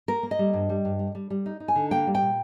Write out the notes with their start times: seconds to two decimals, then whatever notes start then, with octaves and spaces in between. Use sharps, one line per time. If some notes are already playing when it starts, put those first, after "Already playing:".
0.08 A#3 A#4
0.23 A#3
0.31 D#5
0.39 G3
0.53 G2
0.69 G3
0.85 G2
0.99 G3
1.15 G3
1.30 G3
1.46 D#4
1.60 D#4
1.68 G#5
1.76 D3
1.91 A#3 G5
2.07 G3
2.15 G5
2.22 A#2